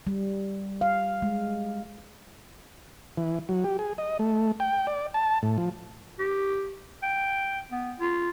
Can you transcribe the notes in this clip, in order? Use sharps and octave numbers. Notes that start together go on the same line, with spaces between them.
G3
F5
G#3
E3
F#3
G4
G#4
D#5
A3
G5
D5
A5
A2
F3
G4
G5
B3
F4